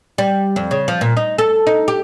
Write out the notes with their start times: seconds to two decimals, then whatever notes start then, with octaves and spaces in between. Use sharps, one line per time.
0.18 G3
0.56 F2
0.71 C#3
0.88 F3
1.01 A#2
1.17 D#4
1.38 A4
1.67 D#4
1.88 G4